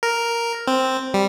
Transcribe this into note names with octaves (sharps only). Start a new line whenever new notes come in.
A#4
C4
G3